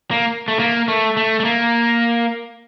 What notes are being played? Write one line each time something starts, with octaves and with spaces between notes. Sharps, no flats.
A#3
A3
A#3
A3
A3
A3
A#3